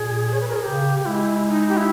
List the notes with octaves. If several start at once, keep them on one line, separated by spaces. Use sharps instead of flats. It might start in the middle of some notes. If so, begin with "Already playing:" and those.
Already playing: A#2 G#4
C#5
B4
A#4
G#4
C#3 G4
G#3 E4
D#4
G4
E4